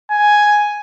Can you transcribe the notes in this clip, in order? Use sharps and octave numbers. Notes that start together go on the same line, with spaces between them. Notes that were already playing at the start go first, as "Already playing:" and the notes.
G#5